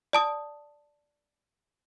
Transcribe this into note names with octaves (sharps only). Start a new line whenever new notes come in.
D5 A5 D#6